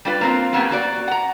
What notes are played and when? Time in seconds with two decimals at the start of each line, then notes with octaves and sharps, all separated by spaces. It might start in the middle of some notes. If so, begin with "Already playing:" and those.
0.05 G3 D4 F4 B4
0.21 A#3 C4 F4
0.53 F#3 A#3 B3 C#4 G4
0.71 A#3 F#4 D5
1.08 F#5 A#5